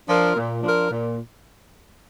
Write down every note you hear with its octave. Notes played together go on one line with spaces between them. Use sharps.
F3 D4 F4 A#4
A#2
F3 D4 F4 A#4
A#2